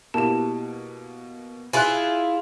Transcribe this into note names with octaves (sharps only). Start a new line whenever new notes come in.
B2 A#3 E4 G4 A5
E4 F4 G#4 G#5 F#6